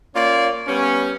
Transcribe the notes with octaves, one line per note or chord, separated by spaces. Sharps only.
A#3 C#4 F4 C#5 D5
G3 B3 C#4